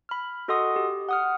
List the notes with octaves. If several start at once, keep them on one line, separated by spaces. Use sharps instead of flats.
B5 F6
F#4 A4 D#5 F#5 C6 D#6
G4
F#5 D#6 F6